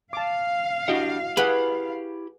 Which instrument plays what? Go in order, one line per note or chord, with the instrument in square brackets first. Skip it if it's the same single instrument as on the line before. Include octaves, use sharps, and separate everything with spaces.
[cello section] F5 [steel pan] A5 D6
[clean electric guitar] D4 G4 F#5 [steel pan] E4 F#4 D#5
[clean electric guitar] E4 G4 B5 [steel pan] G#4 F#5 [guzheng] B4